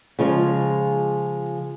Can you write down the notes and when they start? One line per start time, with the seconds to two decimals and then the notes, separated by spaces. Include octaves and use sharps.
0.19 C#3 F3 G#3 F4